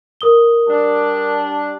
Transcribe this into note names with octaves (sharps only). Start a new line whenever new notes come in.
A#4 D#6 G7
G3 D4